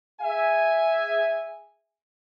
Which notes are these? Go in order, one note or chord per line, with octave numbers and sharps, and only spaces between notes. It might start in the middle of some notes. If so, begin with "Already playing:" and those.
G#4 E5 G#5